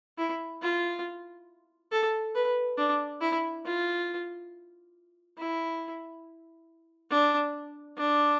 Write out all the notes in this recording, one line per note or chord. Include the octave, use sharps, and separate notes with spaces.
E4
F4
A4
B4
D4
E4
F4
E4
D4
D4